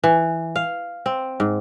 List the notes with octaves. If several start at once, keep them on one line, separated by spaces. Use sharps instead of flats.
E3
F5
C4
G#2